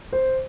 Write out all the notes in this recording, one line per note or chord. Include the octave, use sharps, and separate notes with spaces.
C5